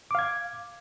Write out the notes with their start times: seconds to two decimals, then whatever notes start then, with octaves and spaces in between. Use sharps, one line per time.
0.11 D6
0.15 F5
0.19 G#6